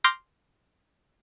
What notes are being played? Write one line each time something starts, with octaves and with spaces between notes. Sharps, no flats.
C6 D6 F6 G6 A#6